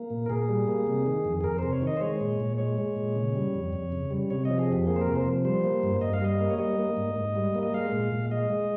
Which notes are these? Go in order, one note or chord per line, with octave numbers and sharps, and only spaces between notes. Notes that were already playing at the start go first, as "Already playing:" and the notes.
Already playing: A#3
A#2
A#4
A#2 G#4
G3
A#3
C3
D#3
F2
G#4
F2 A#4
C3 C5
C#5
D#3
D#5
C5
G#3 C#5
A#2
A#2
G#3 C#5
G#3
A#2
C#3
G3
F2
F2
C#3
G3
C3 C#5
F3 D#5
G#4
F2 G4
A#3 G#4
C5
A#4
C3
C5
F3
G3 C5
A#3
G2
G2 D#5
F5
G3 D#5
A#3
C#5
G3 D#5
A#3
G#2
G#2
G3
A#3
D#5
G#3 F5
A#2
A#2
G#3 D#5
G#3